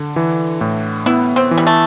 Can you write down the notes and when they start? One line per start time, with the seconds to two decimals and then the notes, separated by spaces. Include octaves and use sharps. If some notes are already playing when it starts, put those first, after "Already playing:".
Already playing: D3
0.16 E3
0.61 A2
1.06 B3 E4
1.36 C4
1.51 E3
1.58 G3
1.67 A3